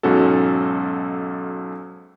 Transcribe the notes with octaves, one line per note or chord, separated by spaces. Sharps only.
B1 G#2 C#4 F#4 A4